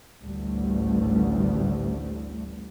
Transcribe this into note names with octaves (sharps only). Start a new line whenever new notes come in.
A1 D2 G3 A3